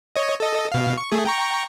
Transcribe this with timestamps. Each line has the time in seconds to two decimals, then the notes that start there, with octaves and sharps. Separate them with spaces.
0.16 C#5 D#5
0.40 A4 D#5
0.72 B2 F5
0.98 C#6
1.12 A3 G#4
1.25 G5 A#5 C#6